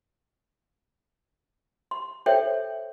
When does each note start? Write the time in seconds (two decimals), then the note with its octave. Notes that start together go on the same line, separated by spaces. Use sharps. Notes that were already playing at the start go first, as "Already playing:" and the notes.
1.91 C6
2.26 A4 C5 C#5 E5 G5